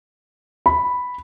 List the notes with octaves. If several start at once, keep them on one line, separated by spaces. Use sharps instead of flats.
B5